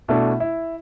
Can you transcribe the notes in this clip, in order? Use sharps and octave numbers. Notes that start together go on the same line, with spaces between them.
B2 A3 D4 E4
E4